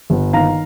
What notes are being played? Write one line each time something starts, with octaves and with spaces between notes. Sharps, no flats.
G1
D#3 F5 A#5